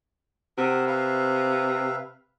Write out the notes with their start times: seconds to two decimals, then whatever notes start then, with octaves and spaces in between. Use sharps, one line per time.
0.58 C3 A#4 F#5 E6
0.87 B4 E5 F5